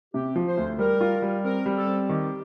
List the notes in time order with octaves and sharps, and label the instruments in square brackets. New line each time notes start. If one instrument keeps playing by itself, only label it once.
[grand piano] C3 [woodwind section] G4
[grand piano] F3
[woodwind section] C5
[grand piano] D2
[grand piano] G3 [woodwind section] A#4
[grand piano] F4
G3
[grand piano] C4 [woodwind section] A#4
[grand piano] G3
[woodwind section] A4
[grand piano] C4
[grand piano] D#3 [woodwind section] G4